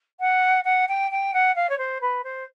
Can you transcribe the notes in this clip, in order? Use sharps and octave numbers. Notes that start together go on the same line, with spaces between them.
F#5
F#5
G5
G5
F#5
F5
C#5
C5
B4
C5